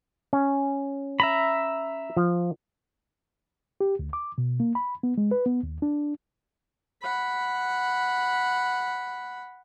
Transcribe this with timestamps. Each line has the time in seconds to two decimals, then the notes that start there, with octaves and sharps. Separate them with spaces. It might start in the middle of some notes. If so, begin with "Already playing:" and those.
0.33 C#4
1.20 E5 A#5 B5
2.17 F3
3.81 G4
3.99 D2
4.13 D6
4.38 B2
4.60 A#3
4.75 B5
5.03 B3
5.18 G#3
5.31 B4
5.46 B3
5.63 D#2
5.82 D4
7.02 F#5 B5